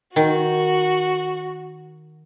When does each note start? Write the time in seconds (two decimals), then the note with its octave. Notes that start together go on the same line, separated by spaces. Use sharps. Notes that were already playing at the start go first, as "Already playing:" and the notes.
0.16 D#3 F#4